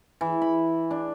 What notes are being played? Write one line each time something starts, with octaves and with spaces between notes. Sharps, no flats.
E3
B5
D4